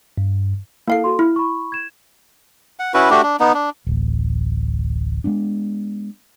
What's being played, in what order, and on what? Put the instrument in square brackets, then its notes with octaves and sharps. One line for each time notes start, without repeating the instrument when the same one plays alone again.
[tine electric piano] G2
[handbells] A#3 F5 C7 [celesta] E4 A4
[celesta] F#4 A4 C6
[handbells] E4 [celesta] F6
[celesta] B5 C#6
G#6 E7
[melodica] F#5
C#4 E4 F#4 B4
A3 D4 F#4 G4
D4
B3 D#4
D4
[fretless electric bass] D1 A1
G#3 A3 B3 D4